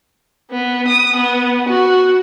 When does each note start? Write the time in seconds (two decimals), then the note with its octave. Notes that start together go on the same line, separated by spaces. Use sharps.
0.51 B3
0.87 D#6
1.16 B3
1.68 F#4